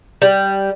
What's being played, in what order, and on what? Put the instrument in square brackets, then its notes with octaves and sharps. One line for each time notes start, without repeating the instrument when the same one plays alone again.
[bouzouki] G3